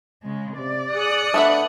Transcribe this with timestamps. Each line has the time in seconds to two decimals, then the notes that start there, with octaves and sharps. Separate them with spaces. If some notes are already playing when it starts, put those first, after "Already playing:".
0.23 C#3 G#3
0.58 C3 D5
0.94 G#4 D#6 F#6 C#7
1.34 A3 B3 D4 E5